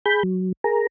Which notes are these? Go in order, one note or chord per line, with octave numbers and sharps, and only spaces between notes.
G#4 B5 G6
F#3
G#4 A#4 A#5